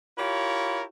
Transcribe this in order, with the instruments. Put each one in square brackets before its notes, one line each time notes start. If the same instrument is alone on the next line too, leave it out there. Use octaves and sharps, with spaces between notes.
[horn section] E4 F4 G4 A#4 C#5